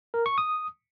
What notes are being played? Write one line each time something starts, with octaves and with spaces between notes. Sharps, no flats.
A#4
C#6
D#6